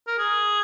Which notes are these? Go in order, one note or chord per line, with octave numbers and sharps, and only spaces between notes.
A#4
G#4